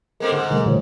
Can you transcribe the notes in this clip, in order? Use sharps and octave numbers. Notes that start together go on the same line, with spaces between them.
G#3 A#3 C4 A4 A#4
G#2 D3 G#4 F#5
B2 D3 D#3 G3 A3 A#4
A#2 E3 C5 C#5